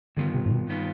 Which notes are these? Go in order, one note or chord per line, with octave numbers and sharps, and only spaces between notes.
G2 D3 D#3 B3 F4
C3
G#2
B2
G2 D#3 B3 F4